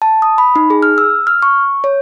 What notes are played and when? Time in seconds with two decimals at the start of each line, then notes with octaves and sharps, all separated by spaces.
0.02 A5
0.22 D#6
0.38 B5
0.56 D#4
0.70 G#4
0.82 F6
0.98 E6
1.27 F6
1.42 C#6
1.84 C#5